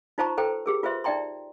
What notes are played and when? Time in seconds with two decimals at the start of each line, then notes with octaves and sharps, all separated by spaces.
0.18 D#4 F4 C5 A5 A#5 C#6
0.37 A4 B4 C5 G5 A#5
0.66 G4 G#4 A#4
0.83 F4 B4 C5 E5 C6
1.04 D#4 D5 E5 G5 A#5 C6